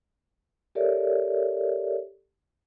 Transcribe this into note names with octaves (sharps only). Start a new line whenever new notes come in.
G4 A4 A#4 C#5 D5 E5